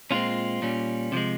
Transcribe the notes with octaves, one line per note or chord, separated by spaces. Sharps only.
A#2 G#3 C4 C#4 F4
A#2 G3 C#4
C3 F3 G#3